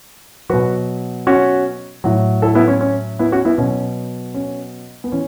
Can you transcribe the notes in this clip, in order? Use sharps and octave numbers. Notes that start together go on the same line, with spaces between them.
B2 F#3 F#4 B4
C#4 F#4
A2 F#3
E4 A4
B3 E4
C#4
C#4
B3 E4
C#4 F#4
B3 E4
B2 F#3 C#4
C#4
B3
E3 C#4